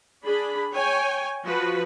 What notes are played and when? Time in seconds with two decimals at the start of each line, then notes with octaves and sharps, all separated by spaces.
0.24 D4 G#4 B5
0.74 C#5 G5 G#5
1.44 F3 F#4 B4